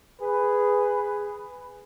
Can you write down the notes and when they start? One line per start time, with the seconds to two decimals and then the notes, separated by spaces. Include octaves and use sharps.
0.21 G#4 B4